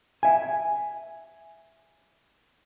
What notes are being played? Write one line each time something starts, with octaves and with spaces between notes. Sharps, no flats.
E5 G#5